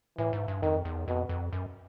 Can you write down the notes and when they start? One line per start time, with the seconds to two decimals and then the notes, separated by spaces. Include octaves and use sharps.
0.18 A2 E3
0.33 G#2
0.48 G2
0.62 F2 D#3
0.85 E2
1.07 F2 B2
1.29 F2
1.53 F#2